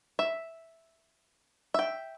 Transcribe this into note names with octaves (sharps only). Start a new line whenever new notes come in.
E5
E5 G5